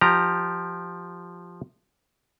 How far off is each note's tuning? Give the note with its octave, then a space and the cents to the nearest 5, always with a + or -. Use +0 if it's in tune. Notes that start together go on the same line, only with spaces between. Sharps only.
F3 +0 G4 -5 A#5 +0